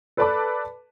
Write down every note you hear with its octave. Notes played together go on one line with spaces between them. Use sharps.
A4 B4 D5 A5 B5 D6